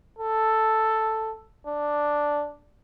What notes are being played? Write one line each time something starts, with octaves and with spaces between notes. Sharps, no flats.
A4
D4